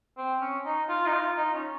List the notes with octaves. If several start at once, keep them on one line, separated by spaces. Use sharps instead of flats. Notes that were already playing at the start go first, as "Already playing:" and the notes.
C4
C#4
D#4
F4
D#4
F4
D#4
C#4